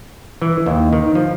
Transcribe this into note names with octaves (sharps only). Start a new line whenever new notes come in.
E3
D#2
D#3
F3